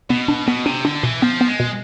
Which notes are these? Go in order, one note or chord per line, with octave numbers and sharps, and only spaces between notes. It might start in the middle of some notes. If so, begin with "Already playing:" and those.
B2 B3
D4
B2 B3
C3 D4
D3 D4
B2 E3
F3 B3
B3
G#3
B2